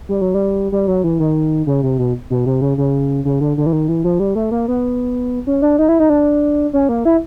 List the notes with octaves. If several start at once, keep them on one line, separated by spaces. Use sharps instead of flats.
G3
F#3
G3
G3
F#3
E3
D#3
C#3
C3
B2
B2
C3
C#3
C#3
C#3
D3
D3
E3
D#3
E3
F3
G3
A3
A#3
B3
C#4
D4
D#4
E4
D#4
D4
C#4
A#3
E4